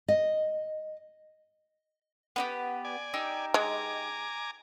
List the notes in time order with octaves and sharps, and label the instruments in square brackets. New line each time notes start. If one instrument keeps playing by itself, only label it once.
[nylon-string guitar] D#5
[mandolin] B3 D#4 G4
[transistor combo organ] D5 G#5
[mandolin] D#4 G4 E6
[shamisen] G#3 [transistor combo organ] G#5 A#5 D6